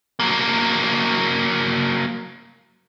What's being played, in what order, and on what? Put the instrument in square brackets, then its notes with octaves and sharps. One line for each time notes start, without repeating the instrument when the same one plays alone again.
[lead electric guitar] F#3 A#3